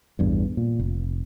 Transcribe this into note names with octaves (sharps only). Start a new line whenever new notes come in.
A1 E2 G2
A#2
F1